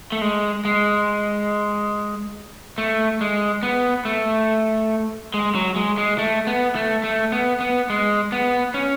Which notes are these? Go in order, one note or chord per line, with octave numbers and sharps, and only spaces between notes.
A3
G#3
G#3
A3
G#3
B3
A3
G#3
F#3
G#3
G#3
A3
B3
A3
A3
B3
B3
G#3
B3
C#4